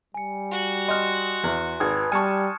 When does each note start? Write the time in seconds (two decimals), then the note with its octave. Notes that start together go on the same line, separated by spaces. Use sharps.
0.14 G3 G#5 C#7
0.52 F#4
0.88 D#5 C6 F6 F#6
1.44 E2
1.80 G#1 B4 D#6 G#6
2.12 G3 G#5 A5 C#6 F6 C#7